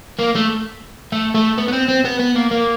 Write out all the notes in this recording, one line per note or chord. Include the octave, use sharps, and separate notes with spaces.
A#3
A3
A3
A3
B3
B3
C4
C4
B3
B3
A#3
A#3